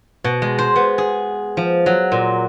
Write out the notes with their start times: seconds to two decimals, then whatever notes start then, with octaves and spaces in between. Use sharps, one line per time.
0.24 B2
0.42 G#3
0.58 C5
0.76 B3
0.98 G#4
1.57 F3
1.86 F#3
2.12 A#2